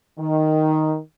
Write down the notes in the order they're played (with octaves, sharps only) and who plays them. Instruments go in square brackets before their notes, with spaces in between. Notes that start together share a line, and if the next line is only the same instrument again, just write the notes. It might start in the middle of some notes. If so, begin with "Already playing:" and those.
[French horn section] D#3